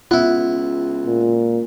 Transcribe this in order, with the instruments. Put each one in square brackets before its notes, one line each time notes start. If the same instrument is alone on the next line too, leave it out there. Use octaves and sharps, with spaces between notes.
[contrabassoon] C#2 [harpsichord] B3 E4 [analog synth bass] F4
[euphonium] A#2